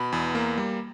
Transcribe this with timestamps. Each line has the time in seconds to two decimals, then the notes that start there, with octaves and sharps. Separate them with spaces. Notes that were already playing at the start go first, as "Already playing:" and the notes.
Already playing: B2 B5
0.12 E2
0.35 A#3
0.58 G3